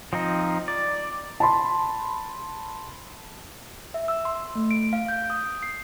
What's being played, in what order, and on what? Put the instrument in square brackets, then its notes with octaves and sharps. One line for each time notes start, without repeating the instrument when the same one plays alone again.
[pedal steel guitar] F3 C4 D#4
D5
[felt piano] A5 B5 C6
[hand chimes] E5
E6
C6
A3
D7
F5
G6
D#6
C7